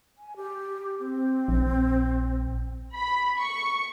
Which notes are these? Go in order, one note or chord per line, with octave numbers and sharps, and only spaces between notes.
G#5
G4
C4
A#1
B5
C#6